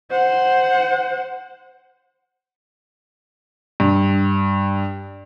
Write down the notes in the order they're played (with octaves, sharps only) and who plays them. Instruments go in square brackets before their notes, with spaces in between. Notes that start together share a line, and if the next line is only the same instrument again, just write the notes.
[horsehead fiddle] C5 F#5
[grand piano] G2